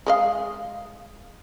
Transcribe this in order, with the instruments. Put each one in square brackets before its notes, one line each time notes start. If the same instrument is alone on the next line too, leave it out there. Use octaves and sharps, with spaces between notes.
[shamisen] G#3 D#5 F5